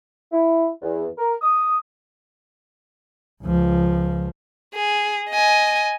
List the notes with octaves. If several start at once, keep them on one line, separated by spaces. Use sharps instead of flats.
E4
E2
A#4
D#6
C#2 F3
G#4
D#5 G#5